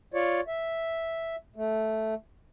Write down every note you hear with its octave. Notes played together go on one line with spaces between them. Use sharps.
F4 C#5 D5
E5
A3